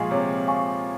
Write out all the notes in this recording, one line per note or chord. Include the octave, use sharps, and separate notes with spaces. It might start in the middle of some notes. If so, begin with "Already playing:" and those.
Already playing: A#2 F3 G#3 F5 G#5 C#6
C3 C#5
F5 G#5 C#6